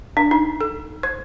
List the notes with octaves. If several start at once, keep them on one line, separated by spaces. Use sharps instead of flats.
D4
D#4
A4
C5